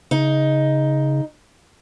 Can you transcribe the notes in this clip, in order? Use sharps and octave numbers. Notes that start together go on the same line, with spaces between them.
C#3 D#4